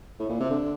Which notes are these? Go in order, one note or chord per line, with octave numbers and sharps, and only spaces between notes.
A2
A#2
C3
D3